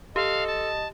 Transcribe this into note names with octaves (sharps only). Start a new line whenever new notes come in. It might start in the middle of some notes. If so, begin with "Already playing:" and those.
G4 A4 D#5 F5
A5